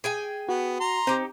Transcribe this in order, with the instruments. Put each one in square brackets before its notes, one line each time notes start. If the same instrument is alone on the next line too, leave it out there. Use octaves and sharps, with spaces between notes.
[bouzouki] G#4 G5 G#5
[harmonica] B3 [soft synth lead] F#4
[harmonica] A#5 C6
[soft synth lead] C4 [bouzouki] D#4 G4